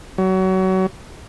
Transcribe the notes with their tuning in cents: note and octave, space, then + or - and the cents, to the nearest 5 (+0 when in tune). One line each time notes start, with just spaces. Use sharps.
F#3 +30